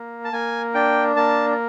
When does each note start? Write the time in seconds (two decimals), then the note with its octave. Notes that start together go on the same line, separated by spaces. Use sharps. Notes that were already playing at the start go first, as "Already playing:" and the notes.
Already playing: A#3
0.25 A5
0.33 A#3 G#5
0.74 D4 G5
1.16 A#3 A5